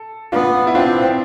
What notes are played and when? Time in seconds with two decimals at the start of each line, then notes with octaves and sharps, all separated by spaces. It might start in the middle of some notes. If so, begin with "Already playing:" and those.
Already playing: A4
0.32 B3 D4 F4
0.67 E4
0.75 C4 D4 F4